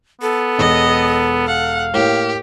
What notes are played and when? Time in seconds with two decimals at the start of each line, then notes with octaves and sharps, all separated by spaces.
0.22 B3 A4
0.59 E1 D#5
1.47 F5 F#5
1.94 A2 A#3 G4